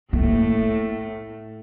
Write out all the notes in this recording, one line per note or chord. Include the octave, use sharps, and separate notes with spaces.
A2 A3 A#3